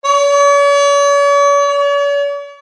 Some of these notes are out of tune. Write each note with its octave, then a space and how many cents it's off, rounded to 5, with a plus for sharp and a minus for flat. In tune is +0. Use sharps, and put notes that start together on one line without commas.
C#5 +45
C#5 +45